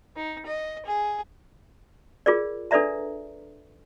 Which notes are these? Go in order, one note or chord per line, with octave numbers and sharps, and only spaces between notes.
D#4
D#5
G#4
F4 G#4 A#4 D5
D4 A4 B4 D5 E5 A#5